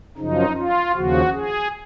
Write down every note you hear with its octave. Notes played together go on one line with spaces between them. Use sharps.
F#2 C#3 F3 D#4
F4
D#2 C#3 F3 F#4
G#4